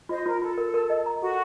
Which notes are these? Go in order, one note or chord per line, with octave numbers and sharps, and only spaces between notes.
F4 C5 D#5
F4 A#4
F4 A4
A#4
A#4
D#5
A#5
F#4 A4